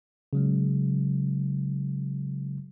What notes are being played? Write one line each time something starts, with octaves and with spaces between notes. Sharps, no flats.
C#3 F#3 G#3